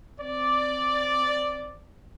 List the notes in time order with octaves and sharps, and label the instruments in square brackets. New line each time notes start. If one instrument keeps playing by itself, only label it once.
[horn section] C4 D5